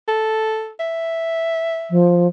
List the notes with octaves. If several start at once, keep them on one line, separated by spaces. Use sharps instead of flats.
A4
E5
F3